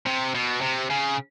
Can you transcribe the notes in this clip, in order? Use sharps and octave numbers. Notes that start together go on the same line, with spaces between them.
C3
B2
C3
C#3